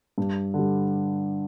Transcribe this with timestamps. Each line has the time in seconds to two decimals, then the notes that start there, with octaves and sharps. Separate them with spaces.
0.18 G2
0.54 D3 G3